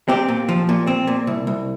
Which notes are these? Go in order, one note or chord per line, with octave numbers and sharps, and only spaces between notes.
C4 G4
A#2
F3
A#2
C4
A#2
C2
C2